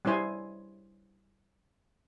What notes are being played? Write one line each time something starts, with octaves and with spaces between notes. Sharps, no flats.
G3 C#4 E4 C5 G#5